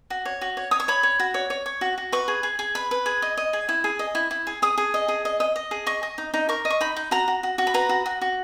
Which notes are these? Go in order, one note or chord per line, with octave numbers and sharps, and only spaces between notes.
F#4
C#5
F#4
C#5
C#5 D#6
C#6
C#5 B5
C#5
F#4
C#5
C#5
C#5
F#4
F#4
B4 C#6
G#4
G#4
G#4
B4 B5
B4
G#4
D#5
D#5
G#4
E4
G#4
D#5
E4
E4
G#4
G#4 D#6
G#4
D#5
G#4
D#5
D#5
D#5
G#4
D#5 C#6
D#5
D#4
D#4
A#4 C#6
D#5
C#6
D#4 B5
D#4
F#4 A#5
F#4
F#4
F#4
B5
B4 A#5
F#4
F#4
F#4